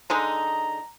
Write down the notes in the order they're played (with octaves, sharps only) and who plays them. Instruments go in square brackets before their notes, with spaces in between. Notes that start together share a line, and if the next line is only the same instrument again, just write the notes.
[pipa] D3 G#3 D#4 [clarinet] A#5